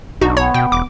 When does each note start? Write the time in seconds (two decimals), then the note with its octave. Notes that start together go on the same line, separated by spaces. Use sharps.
0.21 B1 D4 D#4 F#4
0.37 B3 C#5
0.54 B2 G5
0.72 E1 D6